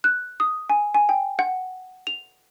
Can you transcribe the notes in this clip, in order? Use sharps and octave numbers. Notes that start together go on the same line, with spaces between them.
F#6
D#6
G#5
G#5
G5
F#5
F7